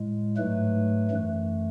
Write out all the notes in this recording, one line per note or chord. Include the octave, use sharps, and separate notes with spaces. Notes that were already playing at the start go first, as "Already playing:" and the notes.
Already playing: A2 G#3
G#2 F#3 A3 B4
F#2 E3 A3